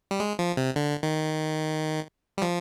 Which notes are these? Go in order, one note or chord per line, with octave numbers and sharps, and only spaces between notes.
G3
G#3
F3
C3
D3
D#3
G3
F3